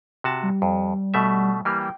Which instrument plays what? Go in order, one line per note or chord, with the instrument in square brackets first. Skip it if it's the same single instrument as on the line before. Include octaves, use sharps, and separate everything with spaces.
[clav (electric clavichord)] C3 F#4 A5
[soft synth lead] G3
[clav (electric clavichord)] F2
B2 A3 E5
[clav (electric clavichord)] E3 G3 A#3 [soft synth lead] F6
[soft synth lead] G5